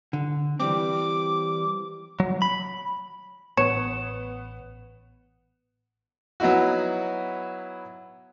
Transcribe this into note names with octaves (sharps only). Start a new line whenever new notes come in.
D3
E3 G3 C4 D6
F#3
B5
A1 B3 C#5 C#7 E7
F#3 B3 D#4 E4 F#4